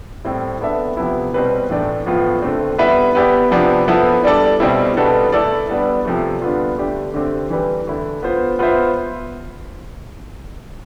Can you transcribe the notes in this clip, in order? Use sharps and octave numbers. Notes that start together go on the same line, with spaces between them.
A2 G3 C4 E4
B3 D4 A4 E5
C3 F3 B3 E4
B2 G3 C4 G4 B4
A2 E3 A3 D4
A2 F3 B3 F4
D3 A3 C4
G3 B3 E4 B4 E5
B3 E4 G4 D5
C3 F3 B3 D4
F3 B3 E4 A4
G3 D4 A4 D5
B2 G3 C4 E4
B2 G3 B3 D4 A4
A3 E4 A4 D5
G3 B3 D4
C3 F3 A3
D3 G3 B3 F4
D3 A3 D4 G4
D3 A3 C4 G4
E3 G3 D4 G4 B4
D3 A3 E4
B3 F4 C5
B3 F4 C5 E5